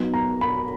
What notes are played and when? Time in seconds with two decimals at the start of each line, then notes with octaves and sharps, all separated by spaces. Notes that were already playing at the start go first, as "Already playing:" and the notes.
Already playing: F#3 B3 D#4
0.14 A#5
0.41 B5